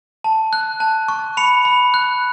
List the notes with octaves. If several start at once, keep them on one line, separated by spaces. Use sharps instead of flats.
A5
F#6
A5
C#6
B5 C#7 F7
B5
F#6